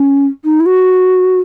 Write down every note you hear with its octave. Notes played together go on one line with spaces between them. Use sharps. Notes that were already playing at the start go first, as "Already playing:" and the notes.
Already playing: C#4
D#4
E4
F#4